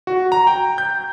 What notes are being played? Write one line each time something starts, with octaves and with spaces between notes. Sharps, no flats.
F#4
A#5
G5
G6